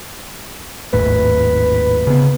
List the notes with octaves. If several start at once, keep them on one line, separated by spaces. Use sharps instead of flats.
G#1 D#2 A2 B4
C#3 B3